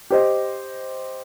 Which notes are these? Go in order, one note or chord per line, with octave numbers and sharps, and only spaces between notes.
G4 C5 D#5